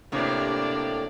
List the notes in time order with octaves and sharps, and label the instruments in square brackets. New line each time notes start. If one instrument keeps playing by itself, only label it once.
[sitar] A2 C3 A#3 [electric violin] D4 D5